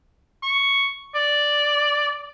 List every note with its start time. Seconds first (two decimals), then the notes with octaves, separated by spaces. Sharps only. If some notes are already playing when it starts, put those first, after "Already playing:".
0.43 C#6
1.15 D5